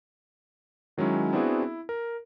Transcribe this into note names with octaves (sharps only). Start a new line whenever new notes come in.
D#3 F#3 G#3 C#4 E4
B3 C4 D4 E4 F#4 G#4
E4
A#4